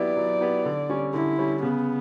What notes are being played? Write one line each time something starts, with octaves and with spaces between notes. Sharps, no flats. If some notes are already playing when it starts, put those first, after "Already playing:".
Already playing: F#3 B3 E4 G4 D5
F#3
B3 E4 G4
D3
G3 C#4
D3 E4
G3 C#4
C#3 B3